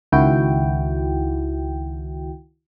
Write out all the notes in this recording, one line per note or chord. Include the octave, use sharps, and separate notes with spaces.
C#2 D#3 E4 F#4 G5